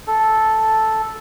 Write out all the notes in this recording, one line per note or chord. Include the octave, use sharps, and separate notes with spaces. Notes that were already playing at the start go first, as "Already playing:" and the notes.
A4